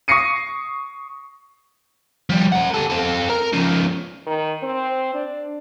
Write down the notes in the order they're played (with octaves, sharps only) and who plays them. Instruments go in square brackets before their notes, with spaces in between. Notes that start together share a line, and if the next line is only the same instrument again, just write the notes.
[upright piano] C#6 D#6 A#6 C7 C#7 D#7
[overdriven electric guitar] F3 G3
A#4 F#5
G4 A4
C4 A4
A#4
C#3 F3
[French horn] D#3
C4
D4